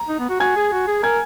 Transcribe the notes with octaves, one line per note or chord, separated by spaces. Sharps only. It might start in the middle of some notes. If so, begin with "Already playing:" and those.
Already playing: A#5
D#4
B3
F#4
F#4 G#5 G#6
G#4
F#4
G#4
A#4 G#5 G#6